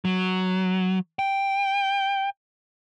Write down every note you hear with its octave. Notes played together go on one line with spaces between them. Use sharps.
F#3
G5